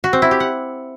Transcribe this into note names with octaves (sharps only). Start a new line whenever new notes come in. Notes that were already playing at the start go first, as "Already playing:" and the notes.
F#4
C4
E4
G4
F#5